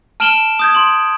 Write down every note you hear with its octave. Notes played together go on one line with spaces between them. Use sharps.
A5 F6 D7 E7 F#7 G7
D#6 G6 G#6
C6 D7 F#7